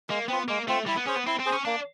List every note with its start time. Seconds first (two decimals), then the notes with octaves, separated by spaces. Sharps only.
0.09 G#3 A#3
0.28 B3 C4 F4
0.48 G#3 A#3
0.68 A3 C4 F4
0.87 G3 E4
0.97 B3
1.06 C#4 G#4 C5
1.16 B3
1.27 C4 E4
1.39 C4
1.46 G#4 C5
1.53 C#4
1.65 A#3 D4